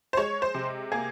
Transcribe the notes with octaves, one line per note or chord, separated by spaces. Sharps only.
C5
G#3 C#5
C5
C3
A#3 G#4